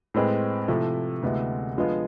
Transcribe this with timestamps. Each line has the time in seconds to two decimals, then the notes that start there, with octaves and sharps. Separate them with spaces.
0.14 A2 G#3 C4 G#4 B4
0.68 C3 F3 A3 E4
1.23 D2 C3 G#3 B3 E4
1.76 D3 F3 G#3 B3 F4